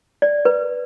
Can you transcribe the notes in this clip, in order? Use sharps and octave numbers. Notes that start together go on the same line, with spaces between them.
D5
B4